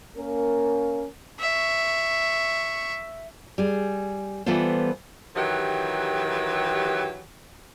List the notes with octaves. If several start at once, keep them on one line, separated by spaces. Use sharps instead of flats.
A#3 C#4 A#4
E5 C#6
G3 G#4
E3 G3 B3 F4 A4 C5
D#3 E3 F#3 G4